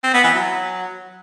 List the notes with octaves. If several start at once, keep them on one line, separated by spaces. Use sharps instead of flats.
C4
B3
E3
F#3